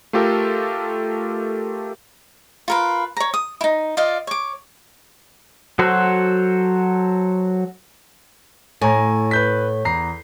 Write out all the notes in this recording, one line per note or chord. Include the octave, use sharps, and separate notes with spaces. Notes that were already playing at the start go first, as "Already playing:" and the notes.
A3 F4 G4 A4 A#4
F4 A#4 B4
C#5 A#5
D#6
D#4 E4
F4 D5 D#5 F5
C#5 D6
F#3 F#4 A4 C5
A2 G#5 A#5
B4 G6 B6
E2 A#5 C7